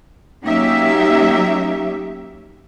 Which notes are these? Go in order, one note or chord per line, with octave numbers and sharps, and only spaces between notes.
F#3 A#3 C#4 D#4 G4 E5